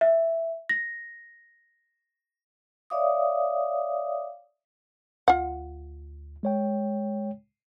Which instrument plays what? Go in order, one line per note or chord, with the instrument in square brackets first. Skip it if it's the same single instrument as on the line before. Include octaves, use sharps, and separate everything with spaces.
[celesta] E5
A#6
[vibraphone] C#5 D5 E5 F5 D6 D#6
[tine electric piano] D2 [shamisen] F4 F#5
[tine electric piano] G#3 C#5 G5